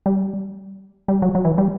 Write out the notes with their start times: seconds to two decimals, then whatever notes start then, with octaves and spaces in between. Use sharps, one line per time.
0.06 G3
1.08 G3
1.22 F#3
1.35 F#3
1.45 E3
1.58 G3